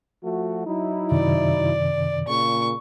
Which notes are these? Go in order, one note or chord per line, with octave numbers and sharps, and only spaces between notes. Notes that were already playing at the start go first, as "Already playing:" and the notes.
F3 A3 F#4
F#3 D#4 E4
F#2 C3 D#3 D5
A#2 C#3 C#6